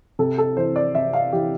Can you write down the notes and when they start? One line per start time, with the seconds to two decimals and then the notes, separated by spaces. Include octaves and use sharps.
0.19 C3 A4
0.38 A4
0.57 E3 C5
0.76 D5
0.95 C3 E5
1.13 F5
1.32 E3 G4